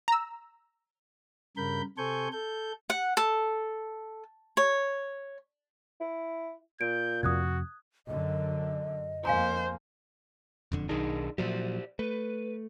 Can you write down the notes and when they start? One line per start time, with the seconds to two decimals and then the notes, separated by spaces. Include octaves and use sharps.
0.08 A#5 E6
1.57 G2 C#3 A#4 B5 G6
1.98 C3 A4 C5 G#5 C#6 G6
2.32 A4 G6
2.90 F#5
3.17 A4
4.57 C#5
6.00 E4
6.81 A#2 G6 D7
7.23 F2 C3 F#4 D#6 F#6 G#6
8.07 F#2 D3 D#5
9.25 F2 A#3 C5 F5 G#5 A#5
10.72 E1 F2 D3
10.89 B1 D#3 D4 D#4 G#4
11.38 A#2 F3 F#3 G4 C5 D5
11.99 A3 B4